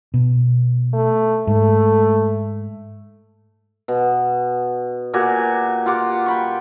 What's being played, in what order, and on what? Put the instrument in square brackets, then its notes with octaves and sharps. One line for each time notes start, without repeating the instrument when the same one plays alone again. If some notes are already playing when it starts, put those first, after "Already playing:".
[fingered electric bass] B2
[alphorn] A3
[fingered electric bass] G#2 [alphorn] A3
[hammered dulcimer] B2
A#2 F#4 G4 G#5
F4 G4 F#5 D6
G5 B5 C#6